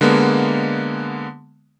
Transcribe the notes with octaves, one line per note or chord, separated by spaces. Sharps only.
D3 G#3 A#3 B3